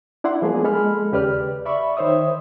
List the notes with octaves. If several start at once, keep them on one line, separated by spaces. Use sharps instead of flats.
D4 E4 D5 F#5 C6
F3 G#3 A#3 B3 G#4
G#3 A4 B5 F6
D#2 C#3 G4 B4 D5 F6
D5 E5 B5 C#6
D#3 C5 C#5 E5 D#6